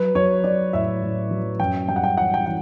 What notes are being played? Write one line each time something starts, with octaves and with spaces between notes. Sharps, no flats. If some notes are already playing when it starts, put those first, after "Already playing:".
Already playing: F#3 B4
F#3 C#5
F#3 D5
A2 E5
A2
F#3
F#2 G5
G3 G5
F#5
G5
E3 F#5
G5
E3 F#5